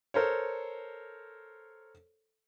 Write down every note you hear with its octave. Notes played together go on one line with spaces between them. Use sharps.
A4 A#4 C5 C#5